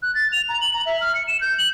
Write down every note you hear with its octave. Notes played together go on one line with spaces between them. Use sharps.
F#6
A6
F7
A#5
F#7
A#5
E5
F6
C#7
E7
G6
F#7